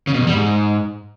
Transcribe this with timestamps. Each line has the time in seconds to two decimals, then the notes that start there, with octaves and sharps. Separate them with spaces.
0.07 C#3
0.14 B2
0.20 E2
0.27 G3
0.33 G#2